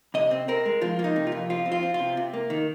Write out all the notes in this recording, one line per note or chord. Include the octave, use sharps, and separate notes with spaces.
C3 D#5
C4
C4 A#4
G#3
F3 F4
A#3 F4
D#4
C3
F4
F2
F3 F4
C4
F4
C4
F4
C3
C3
A#3
D#3